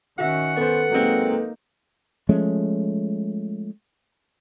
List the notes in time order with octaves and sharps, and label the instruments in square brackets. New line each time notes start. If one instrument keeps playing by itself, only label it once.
[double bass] D#3 C#4 [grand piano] F#4 E5 [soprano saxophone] F#5
[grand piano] B3 C5 [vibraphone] A4 B4
[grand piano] F#3 G#3 C4 [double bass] A#3 D#4
[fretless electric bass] F3 G#3 A3 C#4